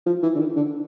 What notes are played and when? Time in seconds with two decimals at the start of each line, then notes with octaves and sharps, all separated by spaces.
0.06 F3
0.23 E3
0.35 D3
0.39 D#3
0.56 D3